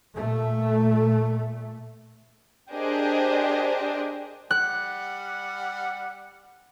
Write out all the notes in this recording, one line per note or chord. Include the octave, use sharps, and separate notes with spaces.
A#2 A3
D4 G4 G#4 A#4 C5 D#5
G3 F#5 F#6